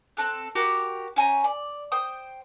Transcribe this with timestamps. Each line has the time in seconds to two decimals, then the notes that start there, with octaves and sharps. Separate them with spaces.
0.17 C4 A4 F#6
0.55 F#4 G4 A#4 D6
1.16 C#4 C5 G#5 A#5
1.44 D5
1.92 C5 G5 D#6